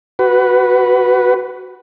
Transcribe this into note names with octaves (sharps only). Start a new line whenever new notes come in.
F#4 B4